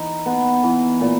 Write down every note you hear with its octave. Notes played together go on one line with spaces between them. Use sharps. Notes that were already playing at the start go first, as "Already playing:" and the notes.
Already playing: E3 D#4
B3
E3
A#2